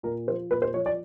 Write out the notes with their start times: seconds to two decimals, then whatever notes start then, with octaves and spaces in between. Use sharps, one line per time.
0.03 A#2 A#4
0.27 F3 C5
0.50 A#2 B4
0.62 C5
0.74 F3 C#5
0.86 D5